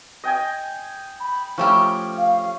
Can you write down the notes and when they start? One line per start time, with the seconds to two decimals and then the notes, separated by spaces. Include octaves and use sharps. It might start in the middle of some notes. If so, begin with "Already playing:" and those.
0.24 D#5 G5 G#5
1.20 B5
1.58 F3 A3 C#4 G4
2.17 F5